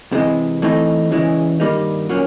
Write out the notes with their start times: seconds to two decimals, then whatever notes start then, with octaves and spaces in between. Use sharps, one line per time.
0.12 C3 E3 G#3
0.62 E3 A3 C4 D#4
1.11 E2 C#3 E3 G#3
1.60 G2 D#3 G3 A#3 D#4
2.09 A#2 F#3 A#3 C#4